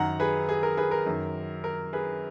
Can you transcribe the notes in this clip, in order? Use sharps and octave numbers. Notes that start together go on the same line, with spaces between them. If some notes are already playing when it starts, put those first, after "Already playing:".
Already playing: F#2 D#3 F#5 A#5
G#4 B4
G#4
A#4
G#4 B4
A#4
F#2 D#3
A#4
G#4 B4